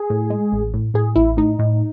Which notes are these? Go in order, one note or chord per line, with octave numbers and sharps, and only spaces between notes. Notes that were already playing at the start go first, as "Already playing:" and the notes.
Already playing: G#4
A2
G#3
A1
A2
A2 G#4
A1 E4
A2 D#4
A2